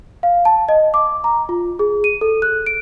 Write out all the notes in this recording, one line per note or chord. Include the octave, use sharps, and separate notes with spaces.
F5
A5
D#5
D6
A#5
F4
G#4
D#7
A4
F#6
D7